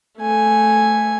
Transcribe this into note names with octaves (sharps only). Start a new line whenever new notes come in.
A3 G#5